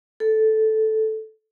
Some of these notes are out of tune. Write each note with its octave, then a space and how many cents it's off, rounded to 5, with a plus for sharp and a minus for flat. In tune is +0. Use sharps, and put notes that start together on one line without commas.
A4 -5